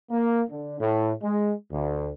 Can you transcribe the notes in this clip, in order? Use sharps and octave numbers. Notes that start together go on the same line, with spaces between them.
A#3
D3
A2
G#3
D2